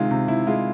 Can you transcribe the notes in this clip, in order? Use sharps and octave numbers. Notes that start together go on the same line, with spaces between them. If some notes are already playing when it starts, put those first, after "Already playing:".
Already playing: C3 D#3 G#3 F4
C3
C3 E4
G#3 F4